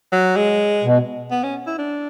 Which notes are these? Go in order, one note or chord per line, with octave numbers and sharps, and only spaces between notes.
F#3
G#3
B2
B3
C#4
E4
D4